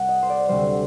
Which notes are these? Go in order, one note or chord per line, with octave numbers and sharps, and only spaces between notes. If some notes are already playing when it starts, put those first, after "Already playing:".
Already playing: C2 C3 G3 F#5
D#5
C5
D5
D2 C3 G3 C5